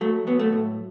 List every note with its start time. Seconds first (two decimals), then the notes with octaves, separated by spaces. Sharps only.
0.01 F#3 A3
0.27 F#3 B3
0.39 A3
0.53 A2